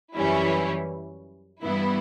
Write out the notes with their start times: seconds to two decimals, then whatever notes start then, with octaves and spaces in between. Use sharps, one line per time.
0.15 F#2 E3 G3 C#4 E4
1.62 G2 E3 B3 E4